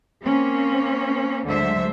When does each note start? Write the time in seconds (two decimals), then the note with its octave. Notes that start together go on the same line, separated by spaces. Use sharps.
0.23 A#3 C4 C#4
1.46 D2 D3 F#3 G#3 C5 E5